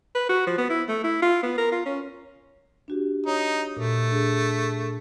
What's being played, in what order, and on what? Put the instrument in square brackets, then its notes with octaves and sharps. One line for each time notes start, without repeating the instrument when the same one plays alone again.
[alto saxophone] B4
F#4
F3
B3
E4
A3
E4
F4
B3
A#4
F4
C#4
[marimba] D4 F#4 G4
[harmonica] D#4 [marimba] C#5
[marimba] A#2 [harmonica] A3
[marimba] D4 G#4